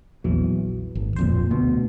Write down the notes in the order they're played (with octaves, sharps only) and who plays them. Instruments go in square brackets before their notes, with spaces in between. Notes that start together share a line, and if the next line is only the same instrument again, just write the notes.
[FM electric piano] A#1 E2 E3 [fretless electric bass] F#3
[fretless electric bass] G#1
[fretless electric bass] D1 F2 A#2 [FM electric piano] C5
[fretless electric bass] D2 [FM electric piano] B2